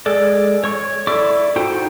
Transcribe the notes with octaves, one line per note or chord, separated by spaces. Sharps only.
G#3 A4 D5
C#5 C#6
E4 A4 D5 C#6 D6
D#4 F#4 A4 C5 G5